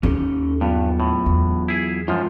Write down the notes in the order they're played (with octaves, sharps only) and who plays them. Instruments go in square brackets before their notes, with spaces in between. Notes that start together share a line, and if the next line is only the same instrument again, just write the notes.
[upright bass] D#2 [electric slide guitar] C#4 G4 A4
[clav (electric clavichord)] G2 [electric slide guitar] F#3 B3 F4
[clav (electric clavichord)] A2
[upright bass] E2
[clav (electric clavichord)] E4 G#4
[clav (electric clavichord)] F#2 F3 [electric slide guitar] G#3 F4